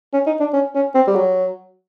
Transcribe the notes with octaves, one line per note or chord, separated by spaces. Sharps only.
C#4
D#4
D4
C#4
C#4
C4
G3
F#3